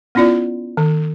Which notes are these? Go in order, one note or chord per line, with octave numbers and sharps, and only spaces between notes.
B3 C#4 E4 F4 D5
D#3